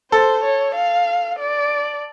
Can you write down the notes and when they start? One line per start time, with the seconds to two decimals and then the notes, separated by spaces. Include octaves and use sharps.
0.12 A4 C5
0.44 C#5
0.76 F5
1.40 D5